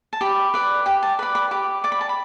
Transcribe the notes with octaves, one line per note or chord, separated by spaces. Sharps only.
A5
G4 B5
B4 D5
G4 G5
A5
B4 D5 B5
B5
G4 D6
D5 D6
B5
A5
B5